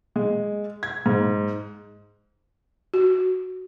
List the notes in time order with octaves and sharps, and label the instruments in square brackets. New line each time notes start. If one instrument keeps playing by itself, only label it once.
[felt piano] G#3
G#6
G#2
[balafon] F#4